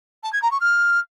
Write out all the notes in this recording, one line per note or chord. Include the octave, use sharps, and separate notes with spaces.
A5
G#6
A#5
C#6
F6